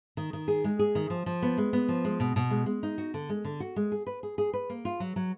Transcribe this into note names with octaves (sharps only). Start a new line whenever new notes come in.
D#3
D#3
G#4
G#3
G#4
D#3
F3
F3
B3
G#3
B3
F3
G#3
B2
B2
G#3
G#3
D#4
F#4
D3
G#3
D3
F#4
G#3
G#4
B4
G#4
G#4
B4
A#3
F4
F#3
F#3